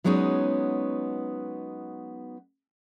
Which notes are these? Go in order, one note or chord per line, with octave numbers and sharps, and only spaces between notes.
F#3 G#3 B3 C#4 D#4